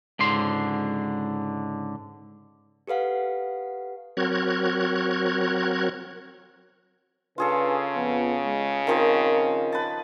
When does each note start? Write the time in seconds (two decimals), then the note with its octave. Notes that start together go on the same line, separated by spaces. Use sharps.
0.19 C#2 G#2 D3 C6
2.87 G4 A4 B4 F5 F#5
4.17 F#3 C4 F#4 A#4 F#6 G#6
7.38 C#3 D4 F4 G#4 A4 B4
7.95 F2 F3 B3
8.44 G#3
8.87 D#3 F3 C4 A#4 D#5
9.72 B4 A5